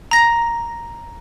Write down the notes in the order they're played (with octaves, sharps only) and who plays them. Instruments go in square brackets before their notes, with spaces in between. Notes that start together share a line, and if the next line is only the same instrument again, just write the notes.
[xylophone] A#5 A#6